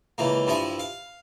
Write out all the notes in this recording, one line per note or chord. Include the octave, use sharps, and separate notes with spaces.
C#2 E3 A#3
G2 F3 E4 G#5
F5